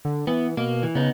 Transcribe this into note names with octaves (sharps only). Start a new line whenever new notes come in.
D3
E3 B3
B2 A#3
E3
C#3 B3 D#4